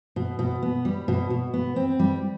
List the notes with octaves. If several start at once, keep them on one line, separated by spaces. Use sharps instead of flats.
B2
B2
B3
G3
B2
B2
B3
C4
G3